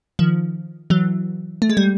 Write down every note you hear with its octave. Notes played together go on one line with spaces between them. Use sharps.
D#3 F3
E3 F#3
A3
G#3
G3